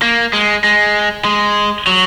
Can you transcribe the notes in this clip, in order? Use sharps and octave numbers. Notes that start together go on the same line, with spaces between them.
A#3
G#3
G#3
G#3
F#3